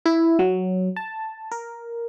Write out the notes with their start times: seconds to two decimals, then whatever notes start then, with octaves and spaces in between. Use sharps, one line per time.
0.06 E4
0.39 F#3
0.96 A5
1.51 A#4